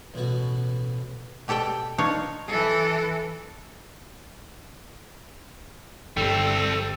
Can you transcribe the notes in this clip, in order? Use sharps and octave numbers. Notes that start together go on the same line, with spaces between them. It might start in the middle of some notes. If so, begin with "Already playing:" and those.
A1 B2 F#4
B2 G4 A4 D5 G5
D4 D#4 F4 C#5
E3 A4
G1 G3 C4 A4 G5